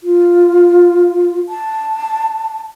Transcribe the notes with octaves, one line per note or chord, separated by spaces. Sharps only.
F4
A5